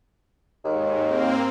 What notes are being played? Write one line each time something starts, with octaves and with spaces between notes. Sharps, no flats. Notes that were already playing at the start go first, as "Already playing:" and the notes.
D#2 G#2
A#3 C4